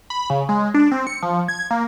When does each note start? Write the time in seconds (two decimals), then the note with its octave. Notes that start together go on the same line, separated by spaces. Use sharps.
0.10 B5
0.30 C#3
0.49 G#3
0.74 D4
0.91 C4
1.07 C#7
1.23 F3
1.48 G#6
1.71 A#3